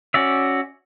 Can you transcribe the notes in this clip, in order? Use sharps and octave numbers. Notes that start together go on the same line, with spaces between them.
C#4 F#4 D5 E5